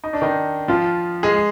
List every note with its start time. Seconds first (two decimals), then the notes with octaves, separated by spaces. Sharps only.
0.04 D#4
0.13 D4
0.22 D#3 D#4
0.68 F3 F4
1.23 G#3 G#4